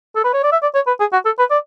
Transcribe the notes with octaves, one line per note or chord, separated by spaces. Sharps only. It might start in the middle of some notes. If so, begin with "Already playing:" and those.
A4
B4
C#5
D5
E5
D5
C#5
B4
G#4
F#4
A4
B4
D5